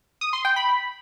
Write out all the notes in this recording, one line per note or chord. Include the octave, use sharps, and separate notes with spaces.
D#6
C6
G5
B5